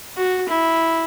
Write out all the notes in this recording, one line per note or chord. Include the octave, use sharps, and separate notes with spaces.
F#4
E4